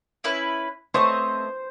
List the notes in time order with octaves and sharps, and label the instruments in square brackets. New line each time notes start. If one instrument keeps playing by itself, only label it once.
[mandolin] C#4 E4 B4
[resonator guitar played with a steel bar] A3 C#5 [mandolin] C4 D#5 [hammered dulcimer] C5